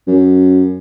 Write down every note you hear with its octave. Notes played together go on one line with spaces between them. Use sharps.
F#2